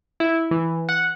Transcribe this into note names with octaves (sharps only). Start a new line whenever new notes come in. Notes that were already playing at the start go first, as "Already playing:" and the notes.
E4
E3
F#5